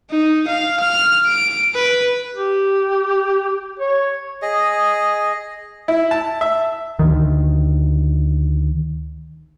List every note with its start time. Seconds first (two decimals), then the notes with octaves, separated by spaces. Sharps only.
0.11 D#4
0.48 F5
0.81 F6
1.27 D7
1.75 B4
2.35 G4
3.79 C#5
4.42 G#4 D#5
5.88 E4
6.11 A5
6.41 E5
6.99 D2 D#3